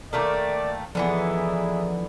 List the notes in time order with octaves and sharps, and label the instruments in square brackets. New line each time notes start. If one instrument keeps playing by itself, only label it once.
[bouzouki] D#3 A3 A#3 [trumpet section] D5
[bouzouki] D3 E3 B3 [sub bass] F3 [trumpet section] D#4 E4 G#4